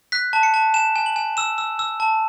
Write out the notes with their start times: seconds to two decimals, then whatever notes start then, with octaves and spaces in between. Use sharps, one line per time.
0.12 F#6 B6
0.33 A5
0.43 C#7
0.54 A5
0.74 G#5 E7
0.96 G#5
1.06 F#7
1.16 G#5
1.37 E6 E7
1.58 E6
1.79 E6
2.00 A5